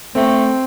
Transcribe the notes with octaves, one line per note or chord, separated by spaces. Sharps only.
A3 C4